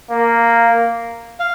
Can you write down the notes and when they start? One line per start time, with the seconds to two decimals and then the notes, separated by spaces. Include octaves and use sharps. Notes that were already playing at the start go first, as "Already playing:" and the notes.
0.11 A#3
1.40 F5